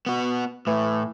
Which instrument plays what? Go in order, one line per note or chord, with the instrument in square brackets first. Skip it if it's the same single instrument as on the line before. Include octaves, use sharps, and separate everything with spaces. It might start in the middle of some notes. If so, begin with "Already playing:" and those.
[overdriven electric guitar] B3 F#4
[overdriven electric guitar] A2 [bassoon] E3